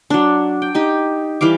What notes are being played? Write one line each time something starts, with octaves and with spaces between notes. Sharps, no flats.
F#3 D4
G5
D#4 G4 D#5
E3 G3 F5 D6